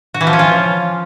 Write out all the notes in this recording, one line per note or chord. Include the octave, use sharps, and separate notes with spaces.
F#4
E3
F3
C#4
F4